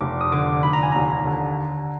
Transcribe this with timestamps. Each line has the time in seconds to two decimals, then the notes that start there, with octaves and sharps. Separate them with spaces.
0.01 F1 D6
0.21 D#6
0.32 D3 D6
0.63 F1 B5
0.73 A#5
0.83 G#5
0.92 D#2 A#5
1.25 D3